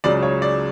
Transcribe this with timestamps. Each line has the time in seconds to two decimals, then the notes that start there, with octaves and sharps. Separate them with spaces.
0.04 C#2 C#3 F#3 D5
0.23 C#5
0.42 D5